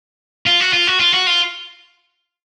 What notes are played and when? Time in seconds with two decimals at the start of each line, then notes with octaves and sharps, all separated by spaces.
0.46 F4
0.60 F#4
0.73 F4
0.87 F#4
1.00 F4
1.14 F#4
1.27 F4